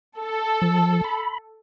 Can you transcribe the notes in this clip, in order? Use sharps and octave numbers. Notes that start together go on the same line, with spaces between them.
A4
F3
B5